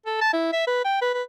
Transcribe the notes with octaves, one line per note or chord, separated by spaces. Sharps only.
A4
A5
E4
E5
B4
G5
B4
B4